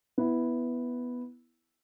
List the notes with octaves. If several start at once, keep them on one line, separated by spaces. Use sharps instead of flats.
B3 E4